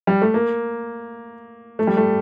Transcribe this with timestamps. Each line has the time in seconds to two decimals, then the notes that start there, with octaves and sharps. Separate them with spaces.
0.07 G3
0.22 A3
0.34 A#3
1.79 A3
1.87 G3
1.97 A3